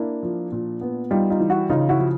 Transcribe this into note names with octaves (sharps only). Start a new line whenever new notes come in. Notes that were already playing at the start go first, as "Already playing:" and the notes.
Already playing: A#3 D4 E4
F3
A#2
B3
G3 D#4 F4
D#4 F4
E3
E4 F#4
C#3 D#4 F4
E4 F#4
F3